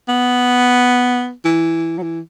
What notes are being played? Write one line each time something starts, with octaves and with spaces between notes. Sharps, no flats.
B3
E3
F#3
E3